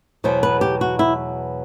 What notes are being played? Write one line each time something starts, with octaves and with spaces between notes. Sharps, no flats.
E2 B2 F#3 C5
B4
G4
F#4
E4